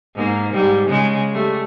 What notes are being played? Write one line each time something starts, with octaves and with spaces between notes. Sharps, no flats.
G#2 A#3
G#2 G3
C#3 G#3
G3 A3